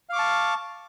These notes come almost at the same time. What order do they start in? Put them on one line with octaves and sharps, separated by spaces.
F5 D6 C#6 A5